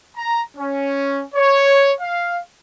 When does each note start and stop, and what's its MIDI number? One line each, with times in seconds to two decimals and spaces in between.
0.17 0.42 82
0.57 1.23 61
1.35 1.92 73
2.00 2.38 77